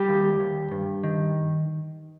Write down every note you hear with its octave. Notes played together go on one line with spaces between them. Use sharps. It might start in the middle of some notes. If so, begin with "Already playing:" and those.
Already playing: G3 G4
D#2
D#2
G2
D#3